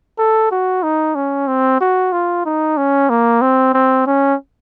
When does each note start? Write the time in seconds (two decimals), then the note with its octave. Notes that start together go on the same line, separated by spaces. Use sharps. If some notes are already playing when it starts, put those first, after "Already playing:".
0.19 A4
0.52 F#4
0.83 D#4
1.15 C#4
1.48 C4
1.81 F#4
2.12 F4
2.46 D#4
2.77 C#4
3.10 A#3
3.41 C4
3.74 C4
4.07 C#4